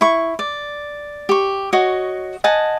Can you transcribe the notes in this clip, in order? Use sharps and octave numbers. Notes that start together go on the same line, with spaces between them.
E4 C#6
D5
G4 C#6
F#4 C#5 D#5
D#5 F#5 G#5 A5